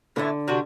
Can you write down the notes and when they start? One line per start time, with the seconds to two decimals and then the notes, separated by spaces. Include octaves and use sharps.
0.16 A2 D3 E3 A3
0.48 C3 G3 D4 F#4